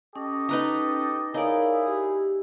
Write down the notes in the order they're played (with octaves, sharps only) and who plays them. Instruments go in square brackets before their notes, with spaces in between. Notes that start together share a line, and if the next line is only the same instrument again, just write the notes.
[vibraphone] C#4 [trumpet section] G4 A4 D#5
[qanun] D#4 B4 A#5
[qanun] D#4 D5 [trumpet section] E4 G#4 [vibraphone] A#4 C#5 F5
[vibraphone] G4